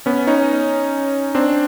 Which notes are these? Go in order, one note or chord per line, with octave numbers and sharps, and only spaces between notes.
B3 C#4
C#4 D#4
C4 D4